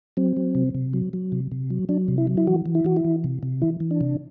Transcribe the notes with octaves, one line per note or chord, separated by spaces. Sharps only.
F#3 C4
F#3
C3
C3
F#3
F#3
C3
C3
F#3
F#3 D4
C3
E4
F#3
E4
E3 F#4
E3
E4
E3 F#4
E4
E3
C3
C3
E3 E4
E3
D4
C3